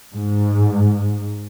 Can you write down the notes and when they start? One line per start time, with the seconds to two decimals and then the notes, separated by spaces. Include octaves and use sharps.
0.14 G#2